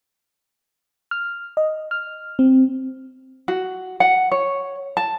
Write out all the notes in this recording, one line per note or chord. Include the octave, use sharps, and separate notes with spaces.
F6
D#5
F6
C4
F#4
F#5
C#5
A5